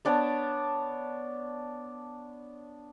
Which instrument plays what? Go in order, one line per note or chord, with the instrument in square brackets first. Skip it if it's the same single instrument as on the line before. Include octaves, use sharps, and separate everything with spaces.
[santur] B3 D4 C#5 A5